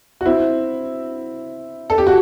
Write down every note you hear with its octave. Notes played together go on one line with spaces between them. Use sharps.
F#4
C4 E4
A4
G4
F#4